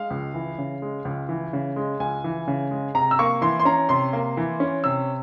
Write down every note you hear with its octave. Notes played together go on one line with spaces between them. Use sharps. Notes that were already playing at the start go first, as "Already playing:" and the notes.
Already playing: G#3 F5
C#2
E3
C#3
G#3
C#2
E3
C#3
G#3
C#2 G#5
E3
C#3
G#3
C3 A#5
E6
A#3 C#6
E3 C6
C6
C#4 A#5
C3 C6
A#3
E3
C#4
C3 E6